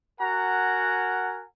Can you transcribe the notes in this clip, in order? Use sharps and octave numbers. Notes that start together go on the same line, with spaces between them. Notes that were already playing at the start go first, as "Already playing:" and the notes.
F#4 A#4 F#5 G#5 A#5